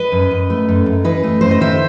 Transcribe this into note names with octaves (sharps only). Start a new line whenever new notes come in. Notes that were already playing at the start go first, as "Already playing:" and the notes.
Already playing: B4 D#5
F#2
F#2
A3
F#2
F#2
E3 B4 D#5
A3
F#2 C5
D#5
D#3 C5 E5